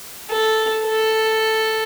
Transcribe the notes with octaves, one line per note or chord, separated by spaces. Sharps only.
A4
A4